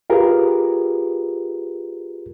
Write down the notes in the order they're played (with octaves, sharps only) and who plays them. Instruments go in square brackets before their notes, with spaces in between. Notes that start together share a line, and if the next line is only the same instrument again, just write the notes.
[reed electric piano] F4 G4 G#4 A#4 B4